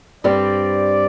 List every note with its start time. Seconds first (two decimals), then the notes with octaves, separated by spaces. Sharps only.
0.24 G2 G3 C4 G4 D5